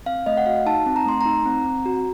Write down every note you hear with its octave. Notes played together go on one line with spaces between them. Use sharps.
C4 F5
A3 D#5
F#5
F#4 F5
D#4 A5
C4
A#5
A3 C6
A#5
D#4
C4
C4
F#4